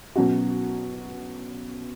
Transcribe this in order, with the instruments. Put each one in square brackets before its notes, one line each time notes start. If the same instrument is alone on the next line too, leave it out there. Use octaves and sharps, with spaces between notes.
[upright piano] B2 F#3 C#4 F#4